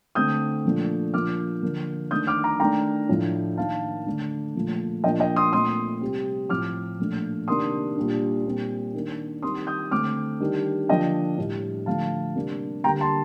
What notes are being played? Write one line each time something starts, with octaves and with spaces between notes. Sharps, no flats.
D3 A3 C4 D#6 G6
A#2 F3 A3 D4
A#2 F3 A#3 D4 D6 F6
D3 F3 A#3 D4
D#3 A3 D4 D#6 G6
D6 F6
A#5 D6
D#3 A3 D4 G5 A#5
A2 F3 A3 D4
D#3 A#3 D4 F5 A5
D3 A3 D4
A#2 F3 A3
A#2 F3 A#3 D4 D#5 G5
D#5 G5
C6 D#6
A#2 A3 C4 C6 D#6
C3 G3 C4
A2 F3 C4 D6 F6
A#2 F3 A3 D4
C3 D#3 A#3 D4 C6 D#6
A#2 G3 D4
A#2 G3 C4
D#3 A#3 D4
D#3 G3 C4 C6 D#6
D#6 G6
D3 A3 C4 D6 F6
D#3 G3 D4
D3 F3 A#3 D4 D#5 G5
A2 G3 D4
D3 F3 A3 F5 A5
C3 G3 A#3 D4
D3 G3 A#3 G5 A#5
A5 C6